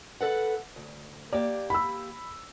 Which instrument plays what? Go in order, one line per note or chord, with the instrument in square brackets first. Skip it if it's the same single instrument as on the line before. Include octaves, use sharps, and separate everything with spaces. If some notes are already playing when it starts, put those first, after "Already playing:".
[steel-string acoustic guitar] A4 B4 F#5
D2
[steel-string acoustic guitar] A#3 G4 [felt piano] D5
[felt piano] B5 E6